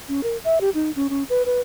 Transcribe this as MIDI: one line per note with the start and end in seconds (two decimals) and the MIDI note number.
0.09 0.21 61
0.23 0.37 70
0.44 0.59 76
0.61 0.70 67
0.74 0.91 63
0.96 1.07 61
1.10 1.23 61
1.30 1.43 71
1.46 1.61 71